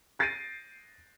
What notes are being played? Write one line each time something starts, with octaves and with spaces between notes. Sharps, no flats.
G6 A6 A#6 C7 D7 D#7